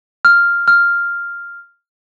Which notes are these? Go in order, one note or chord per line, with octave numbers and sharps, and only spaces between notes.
F6
F6